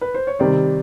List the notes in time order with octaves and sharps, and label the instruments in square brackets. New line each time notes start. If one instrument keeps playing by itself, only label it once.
[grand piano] B4
C5
C#5
[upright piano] C3 D#3 G3 [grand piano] C5 D5